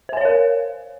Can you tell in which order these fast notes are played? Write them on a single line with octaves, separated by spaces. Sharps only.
C5 G#5 C#5 F5 A#4